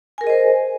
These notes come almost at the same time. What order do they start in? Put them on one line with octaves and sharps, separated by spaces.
G#5 A#4 G#4 D#5 C5